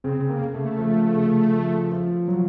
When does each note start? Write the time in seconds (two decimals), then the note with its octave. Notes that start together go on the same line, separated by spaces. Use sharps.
0.04 C#3 C4
0.29 A#3
0.41 C#3
0.54 A3
0.79 F3
1.16 C#3
1.54 F3
1.91 F3
2.28 F3 F#3